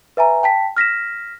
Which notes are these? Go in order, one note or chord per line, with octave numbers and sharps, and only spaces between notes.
B4 E5 G#5 A#5
G5 A5 B6
F6 A#6 B6 E7